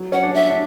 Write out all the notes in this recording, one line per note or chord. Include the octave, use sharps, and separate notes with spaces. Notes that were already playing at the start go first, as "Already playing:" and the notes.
Already playing: F#3
C#4 F#5
D4
E5
D4